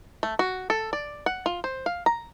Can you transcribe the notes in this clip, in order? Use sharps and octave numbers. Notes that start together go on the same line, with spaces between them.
A3
F#4
A4
D5
F#5
F4
C5
F5
A#5